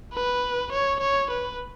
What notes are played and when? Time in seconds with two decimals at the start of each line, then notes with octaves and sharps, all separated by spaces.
0.14 B4
0.72 C#5
1.00 C#5
1.30 B4